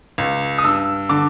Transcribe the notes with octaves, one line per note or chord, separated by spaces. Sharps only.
C#2
D#6
G2 E6
D3 D6